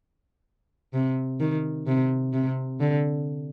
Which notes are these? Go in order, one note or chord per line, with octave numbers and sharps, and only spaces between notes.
C3
D#3
C3
C3
D3